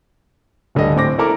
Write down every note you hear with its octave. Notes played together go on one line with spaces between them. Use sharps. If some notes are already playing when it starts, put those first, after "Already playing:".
D1 D3 G3 D#5
A2 C4 D6 A#6
E4 A4 A#4 D6